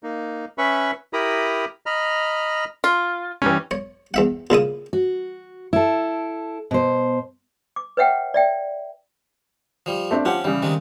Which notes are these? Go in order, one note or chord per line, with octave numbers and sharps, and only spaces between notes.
A#3 D#4
C#4 B4 E5 B5 C#6
E4 G4 A#4 A#5 B5 D#6
D#5 A#5 B5 F6
F4
E3 G3 C#4
C#5
E2 E5 F#5
A#2 C#3 E4 D#6
F#4
E4 A4
B2 C5
D6
B4 C#5 E5 F#5 G5
D5 E5 G5
F3 G3
A3 C4 D4
F3 C4 C#4 G4 F#5
C#3 E3 G3
C3 D#3 G#3